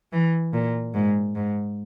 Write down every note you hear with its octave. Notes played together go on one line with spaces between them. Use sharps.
E3
A#2
G#2
G#2